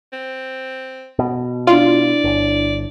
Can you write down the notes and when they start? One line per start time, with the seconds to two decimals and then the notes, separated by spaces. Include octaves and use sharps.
0.13 C4
1.19 B2
1.67 D4 E4 F4 D5
2.24 G1